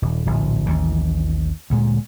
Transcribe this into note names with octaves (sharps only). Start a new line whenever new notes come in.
D#1
D1 A#1
A1 D#2 E3
D2 A#2 G#3